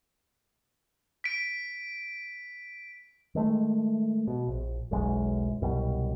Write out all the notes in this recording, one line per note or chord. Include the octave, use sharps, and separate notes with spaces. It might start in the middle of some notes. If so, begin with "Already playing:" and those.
B6 D7
D#3 G#3 A3
B2
A#1
E1 B1 F#2 G#3
C2 F#2 B2 G3